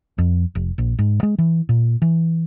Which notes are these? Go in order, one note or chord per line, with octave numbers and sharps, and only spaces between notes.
F2
F1
A#1
G#2
G#3
E3
A#2
E3